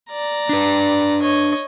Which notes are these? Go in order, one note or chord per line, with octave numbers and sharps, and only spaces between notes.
D5 A#5
D4 B4
C#5 D#5